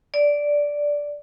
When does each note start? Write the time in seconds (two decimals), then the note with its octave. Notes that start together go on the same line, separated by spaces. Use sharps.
0.14 D5